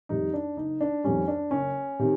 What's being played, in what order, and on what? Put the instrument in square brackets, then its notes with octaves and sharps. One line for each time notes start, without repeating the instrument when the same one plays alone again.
[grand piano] F2 C3 D#3 G3 D#4
D4
F#1 D#4
D4
F2 C3 D#3 G3 C#4
D4
F#1 C#4
C3 D#3